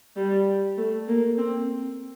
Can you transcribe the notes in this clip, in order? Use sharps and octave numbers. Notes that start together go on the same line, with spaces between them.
G3
A3
A#3
C4